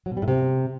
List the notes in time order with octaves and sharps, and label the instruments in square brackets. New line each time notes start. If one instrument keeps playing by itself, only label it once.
[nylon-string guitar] F#3
B2
G3
A2
C3